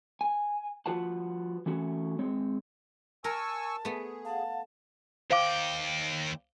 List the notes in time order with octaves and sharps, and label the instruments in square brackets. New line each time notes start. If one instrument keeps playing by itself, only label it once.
[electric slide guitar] G#5
F3 F4 F#4 B4 F#5 A5
E3 A3 C#4 F#4
G#3 C4 C#5
[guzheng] A#4 [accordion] G#5 C#6 E6 [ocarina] A5
[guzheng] A3 B3 [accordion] G#4
[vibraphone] F5 F#5 [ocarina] A5
[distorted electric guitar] D#2 G5 [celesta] C5 F5 D6